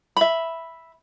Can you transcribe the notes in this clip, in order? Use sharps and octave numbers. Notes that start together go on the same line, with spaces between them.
E5 B5